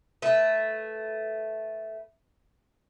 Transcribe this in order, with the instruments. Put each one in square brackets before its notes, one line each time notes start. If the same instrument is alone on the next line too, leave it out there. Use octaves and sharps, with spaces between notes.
[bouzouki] A3 B4